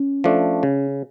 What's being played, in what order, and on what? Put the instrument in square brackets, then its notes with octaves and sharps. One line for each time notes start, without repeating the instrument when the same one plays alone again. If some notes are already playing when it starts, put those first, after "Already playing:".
Already playing: [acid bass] C#4
[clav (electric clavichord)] F3 A3 D4
C#3